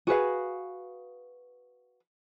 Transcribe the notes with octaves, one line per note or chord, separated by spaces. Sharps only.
F#4 G#4 B4 F5